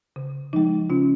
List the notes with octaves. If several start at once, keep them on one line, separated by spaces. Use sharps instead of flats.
C#3
F3 G#3 D#4
C#3 C#4 F4